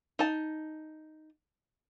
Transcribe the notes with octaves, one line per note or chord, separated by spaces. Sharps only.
D#4 A5